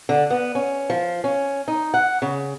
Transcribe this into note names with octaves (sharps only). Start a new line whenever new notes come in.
D3
B3
C#4
F3
C#4
D#4
F#5
C#3